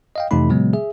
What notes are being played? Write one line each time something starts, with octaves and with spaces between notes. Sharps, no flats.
D#5 F5 G5
F2 C3 E3 A3 D#4 B5
A#2 C#3 F#3 G#3 B3
G#4 E5